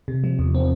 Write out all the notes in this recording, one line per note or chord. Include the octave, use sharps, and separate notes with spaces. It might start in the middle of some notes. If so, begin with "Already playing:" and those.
C3
F3
E2
C4